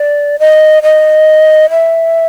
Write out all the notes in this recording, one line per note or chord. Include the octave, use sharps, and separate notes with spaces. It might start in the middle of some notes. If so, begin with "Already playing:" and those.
Already playing: D5
D#5
D#5
E5